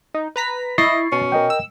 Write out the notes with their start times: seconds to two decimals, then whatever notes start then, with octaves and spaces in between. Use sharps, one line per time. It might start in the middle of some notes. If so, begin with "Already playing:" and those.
0.14 D#4
0.36 B4 A#5 B6
0.78 E4 D#5 C#6 A6 C7
1.12 B2 C#4
1.32 A#4 D#5 G5
1.50 E6